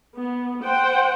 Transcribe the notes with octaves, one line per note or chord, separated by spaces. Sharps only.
B3
C5 F#5 G5